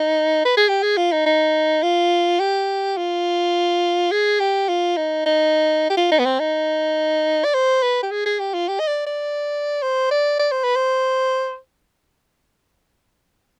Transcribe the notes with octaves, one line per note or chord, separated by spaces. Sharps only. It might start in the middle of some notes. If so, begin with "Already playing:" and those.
Already playing: D#4
B4
G#4
G4
G#4
F4
D#4
D#4
F4
G4
F4
G#4
G4
F4
D#4
D#4
G4
F4
D#4
B3
C4
D#4
D5
C5
B4
G4
G#4
G#4
G4
F4
G4
D#5
D5
D5
C5
D5
D5
C5
B4
C5